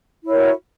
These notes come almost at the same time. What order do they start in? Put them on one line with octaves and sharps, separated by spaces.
E4 C#5 A#4 F#4